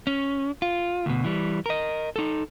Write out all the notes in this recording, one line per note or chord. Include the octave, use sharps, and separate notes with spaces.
C#4
F4
D2 B2
E3 G3
A#4 D#5
D#4 A4